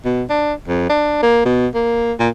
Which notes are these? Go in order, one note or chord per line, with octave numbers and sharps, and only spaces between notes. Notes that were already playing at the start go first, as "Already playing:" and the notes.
B2
D4
F2
D4
A#3
B2
A#3
A#2